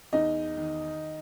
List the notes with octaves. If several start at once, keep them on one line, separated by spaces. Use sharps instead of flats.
E2 D#4 D#5
D#3